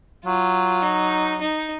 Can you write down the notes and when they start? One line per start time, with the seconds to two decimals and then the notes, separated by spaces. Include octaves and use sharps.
0.25 F#3 F4
0.83 D#4
1.41 D#4